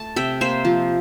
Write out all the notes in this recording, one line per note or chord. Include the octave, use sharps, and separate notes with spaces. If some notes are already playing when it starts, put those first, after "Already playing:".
Already playing: A3 A5
C3 E5 G5
A#3 C5 E5
F3